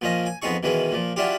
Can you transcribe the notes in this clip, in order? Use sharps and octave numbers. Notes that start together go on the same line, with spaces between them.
A#2 F3 C#4 D#5
G#5
F2 B3 C4 D#4 G#4 C#6
B2 D#3 E3 G#3 C#4
A#2 F3
F#3 C#4 D4 E4 F4 G4